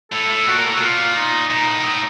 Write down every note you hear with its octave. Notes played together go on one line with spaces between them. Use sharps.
A2 A4
A2
A#2 F#4
A#4
A2 A4
F#4
C3
A#2 F4
D#4
A#2 D#4
A2
A#2
A2 D#4